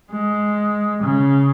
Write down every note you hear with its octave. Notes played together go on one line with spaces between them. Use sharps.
G#3
C#3